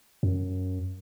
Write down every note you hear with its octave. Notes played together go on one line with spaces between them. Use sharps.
F#2